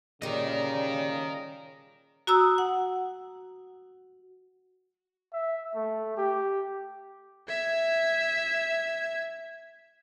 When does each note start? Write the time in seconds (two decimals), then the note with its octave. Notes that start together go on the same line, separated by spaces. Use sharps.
0.22 A#2 C#3 G3 A#4 D#5
2.27 F#4 A#5 D#6 E6
2.58 F#5
5.33 E5
5.75 A3
6.17 G4
7.48 E5 G#6